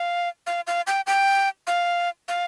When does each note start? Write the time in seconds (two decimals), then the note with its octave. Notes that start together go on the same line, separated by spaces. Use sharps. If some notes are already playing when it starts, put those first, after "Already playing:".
Already playing: F5
0.47 F5
0.67 F5
0.87 G5
1.07 G5
1.67 F5
2.28 F5